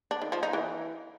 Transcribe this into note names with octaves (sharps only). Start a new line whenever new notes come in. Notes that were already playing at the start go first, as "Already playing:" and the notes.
D4
D#3
F3
D#4
E3